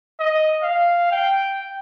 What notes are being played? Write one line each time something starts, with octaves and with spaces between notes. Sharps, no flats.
D#5
F5
G5